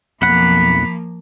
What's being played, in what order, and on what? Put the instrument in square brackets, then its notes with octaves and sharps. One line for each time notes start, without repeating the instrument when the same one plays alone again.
[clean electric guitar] B1 F2 F#5 [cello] F3 A#3 [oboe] B5